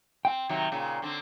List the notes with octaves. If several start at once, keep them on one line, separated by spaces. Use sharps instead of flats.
C4 G5
C3 D#3 F#3
A#2 C#3
D3 C4